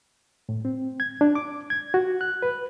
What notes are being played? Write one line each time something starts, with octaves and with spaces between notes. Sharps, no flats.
A2
C4
G#6
D4
D6
G#6
F#4
F#6
B4